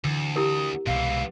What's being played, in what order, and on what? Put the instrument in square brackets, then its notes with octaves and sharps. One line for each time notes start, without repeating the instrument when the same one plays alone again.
[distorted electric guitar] D2 [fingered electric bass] D3 E3
[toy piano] E4 G4 A#4 [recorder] D#6
[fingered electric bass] C2 B2 [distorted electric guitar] G#2 E3 [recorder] F5